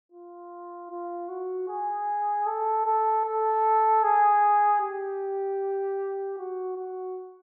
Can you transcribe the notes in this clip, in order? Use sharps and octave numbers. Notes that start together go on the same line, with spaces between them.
F4
F4
F#4
G#4
A4
A4
A4
G#4
G4
F#4
F#4